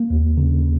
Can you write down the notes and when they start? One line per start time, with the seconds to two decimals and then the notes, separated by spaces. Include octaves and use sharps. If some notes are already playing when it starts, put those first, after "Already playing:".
Already playing: A#3
0.10 D#2
0.37 C#3